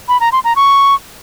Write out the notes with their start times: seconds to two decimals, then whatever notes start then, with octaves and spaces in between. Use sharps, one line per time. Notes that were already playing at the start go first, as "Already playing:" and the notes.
0.09 B5
0.20 A#5
0.32 C6
0.44 A#5
0.56 C#6